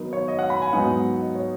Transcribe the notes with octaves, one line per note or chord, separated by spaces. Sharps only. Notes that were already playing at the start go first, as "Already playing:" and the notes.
Already playing: D#3 F#3 B3 D#4
C#5
D#5
F#5
B5
G#5
G#2 F#3 B3 D#4 F#5
D#5
C#5